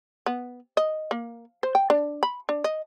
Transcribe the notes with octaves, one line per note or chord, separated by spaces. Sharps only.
B3
D#5
A#3
C5
G5
D4
B5
D4
D#5